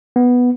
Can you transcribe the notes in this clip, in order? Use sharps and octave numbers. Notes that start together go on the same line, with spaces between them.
B3